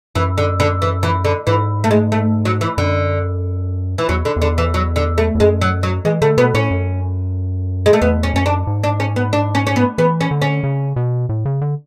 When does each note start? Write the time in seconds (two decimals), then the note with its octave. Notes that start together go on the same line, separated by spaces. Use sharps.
0.15 F#2 E3
0.38 D3
0.60 D3
0.82 E3
1.03 E3
1.25 D3
1.47 G#2 E3
1.84 A3
1.91 G#3
2.12 A3
2.45 F#3
2.61 E3
2.78 F#2 D3
3.98 E3
4.09 E2 F#3
4.25 D3
4.36 E2
4.42 D3
4.58 E3
4.74 F#3
4.96 D3
5.18 A3
5.35 E2
5.40 F#2 G#3
5.61 F#3
5.83 F#3
6.05 E3 G#3
6.22 D3 A3
6.37 B2 B3
6.54 A2 C#4
6.71 F#2
7.86 G#3
7.93 A3
8.02 E2 B3
8.23 C#4
8.34 F#2 C#4
8.46 D4
8.67 G#2
8.84 D4
9.00 C#4
9.16 B3
9.33 D4
9.55 C#4
9.67 C#4
9.76 B3
9.98 E3 B3
10.21 C#4
10.31 D3
10.42 C#4
10.63 C#3
10.96 B2
11.29 A2
11.45 C#3
11.61 D3